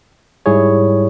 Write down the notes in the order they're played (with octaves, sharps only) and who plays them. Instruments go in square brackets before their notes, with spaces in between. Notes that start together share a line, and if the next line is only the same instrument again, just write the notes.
[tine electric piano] G#2 G3 E4 G#4 C#5